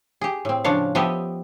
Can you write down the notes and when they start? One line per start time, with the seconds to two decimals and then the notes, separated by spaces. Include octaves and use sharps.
0.21 G4 G#4
0.45 A2 C4
0.64 C#3 F3 D4 F4 C#5 F5
0.95 F3 B3 G4 D#5 E5